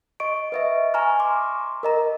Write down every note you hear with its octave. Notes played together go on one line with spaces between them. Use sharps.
D#5 C#6 D7
B4 D#5 E5
G#5 A#5 C#6 F6
C6 D6
A#4 D#5 A#5